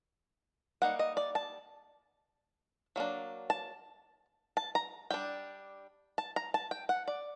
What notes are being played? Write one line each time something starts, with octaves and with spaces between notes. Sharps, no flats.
G3 A#3 D#4 F#5
D#5
D5
A5
F#3 A#3 D4
A5
A5
A#5
G3 D4 G5
A5
A#5
A5
G5
F#5
D5